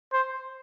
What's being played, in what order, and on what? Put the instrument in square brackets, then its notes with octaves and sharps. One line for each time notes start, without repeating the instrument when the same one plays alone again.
[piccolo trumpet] C5